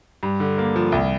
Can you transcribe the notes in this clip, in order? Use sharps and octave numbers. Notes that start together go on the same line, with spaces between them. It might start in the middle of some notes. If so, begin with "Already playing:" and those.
G2
D3
A#3
F3
C2